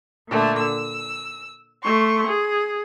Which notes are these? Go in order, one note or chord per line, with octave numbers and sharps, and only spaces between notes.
A#2 D3 A3
E6
A3 C6 C#6
G#4